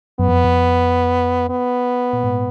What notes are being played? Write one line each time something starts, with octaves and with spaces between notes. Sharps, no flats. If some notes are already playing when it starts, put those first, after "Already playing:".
F#2 B3
F2
F2
B3
A#2
G#2